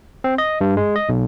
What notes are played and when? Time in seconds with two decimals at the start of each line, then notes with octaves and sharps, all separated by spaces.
0.24 C4
0.38 D#5
0.61 G2
0.77 G#3
0.96 D#5
1.09 B1